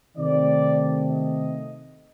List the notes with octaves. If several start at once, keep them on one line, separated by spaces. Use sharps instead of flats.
C3 D#3 A3 C4 D5
D#5